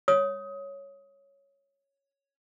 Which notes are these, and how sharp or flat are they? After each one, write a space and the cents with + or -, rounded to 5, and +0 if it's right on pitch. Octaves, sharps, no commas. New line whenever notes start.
C#5 +0 D#6 +20